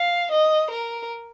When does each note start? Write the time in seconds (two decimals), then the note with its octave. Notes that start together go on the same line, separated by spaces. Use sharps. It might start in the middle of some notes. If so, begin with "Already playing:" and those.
Already playing: F5
0.31 D#5
0.71 A#4